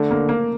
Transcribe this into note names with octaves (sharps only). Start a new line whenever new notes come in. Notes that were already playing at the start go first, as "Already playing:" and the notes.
Already playing: D3 A3
A#3
A#3